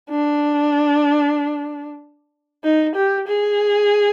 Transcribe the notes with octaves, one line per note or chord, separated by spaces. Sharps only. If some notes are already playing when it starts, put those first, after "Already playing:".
D4
D#4
G4
G#4